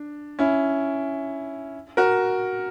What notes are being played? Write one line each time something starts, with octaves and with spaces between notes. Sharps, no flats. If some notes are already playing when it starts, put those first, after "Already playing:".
Already playing: D4
C#4 E4
F#4 A#4